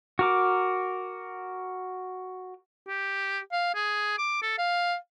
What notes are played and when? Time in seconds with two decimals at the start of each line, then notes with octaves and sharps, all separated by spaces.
0.19 F#4 A#4 D6
2.87 G4
3.52 F5
3.74 G#4
4.18 D6
4.42 A4
4.58 F5